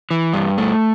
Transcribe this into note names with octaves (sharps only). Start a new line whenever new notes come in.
E3
G2
A3